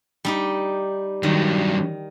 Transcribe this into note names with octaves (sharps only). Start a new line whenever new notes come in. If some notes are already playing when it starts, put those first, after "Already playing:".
G3 D#4 G4
G2 D#3 F#3